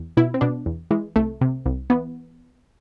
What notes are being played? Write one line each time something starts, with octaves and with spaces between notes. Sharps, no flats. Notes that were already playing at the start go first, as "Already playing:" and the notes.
Already playing: E2
B2 E4
C4
B2 D4
E2
E3 G#3
C2 A3
C3
C2
E3 B3